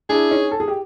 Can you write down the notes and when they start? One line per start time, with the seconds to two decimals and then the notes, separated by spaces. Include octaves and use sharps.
0.09 D4 E4 G#4
0.31 C#4 D#4
0.52 A4
0.60 G#4
0.68 G4